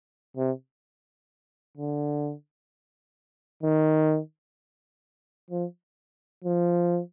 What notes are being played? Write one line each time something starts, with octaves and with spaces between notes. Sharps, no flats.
C3
D3
D#3
F3
F3